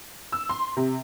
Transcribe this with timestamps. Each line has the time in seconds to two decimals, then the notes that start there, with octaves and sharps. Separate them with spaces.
0.32 E6
0.49 C6
0.77 C3